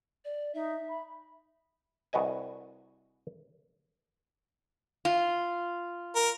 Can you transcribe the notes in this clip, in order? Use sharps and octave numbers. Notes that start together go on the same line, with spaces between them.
D5
D#4 E5
B5
C2 F#4 B4 D#5 G#5
F4
A#4